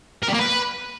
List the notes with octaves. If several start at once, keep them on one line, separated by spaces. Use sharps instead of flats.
A#4
G3
A#3
B4